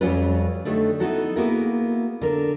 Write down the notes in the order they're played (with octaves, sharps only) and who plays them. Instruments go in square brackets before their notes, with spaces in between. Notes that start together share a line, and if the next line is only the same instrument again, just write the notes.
[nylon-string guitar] F2 F#3 G3 C#4 F4 B4
D3 F#3 A3 D#4 G4
B3 D#4 E4 F#4 A4
A#3 B3 E4 F#4 G#4 A#4
D3 A#4